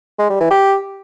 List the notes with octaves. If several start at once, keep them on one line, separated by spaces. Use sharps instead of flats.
G#3
G3
E3
G4